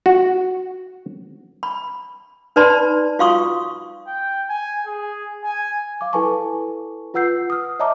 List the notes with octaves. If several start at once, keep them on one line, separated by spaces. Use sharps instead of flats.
F#4
B5
D#4 B4 D5 A5 B5 C6
F4 F#4 F5 C6 C#6 D#6
G5
G#5
G#4
G#5
F5 D6
E4 A4 B4 G#5 A5 C#6
F4 B4 F#5 E6 G6 C7
D#6 F6
C#5 D#5 E5 A5 A#5 D6